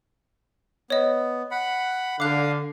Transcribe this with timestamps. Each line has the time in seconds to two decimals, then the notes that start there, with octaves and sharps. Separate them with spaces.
0.90 B3 C#5 D#5
1.51 F#5 B5
2.20 D3 F5 D6 F#6